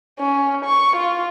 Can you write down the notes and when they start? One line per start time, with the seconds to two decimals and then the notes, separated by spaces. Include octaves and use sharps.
0.20 C#4
0.65 C#6
0.96 F4